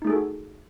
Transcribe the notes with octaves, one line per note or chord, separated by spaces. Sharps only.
A3 D#4 F#4 G#4 A4